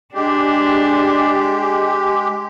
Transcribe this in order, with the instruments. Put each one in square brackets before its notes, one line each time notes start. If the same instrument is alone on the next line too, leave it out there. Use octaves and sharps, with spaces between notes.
[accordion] G#3 G4 [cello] D4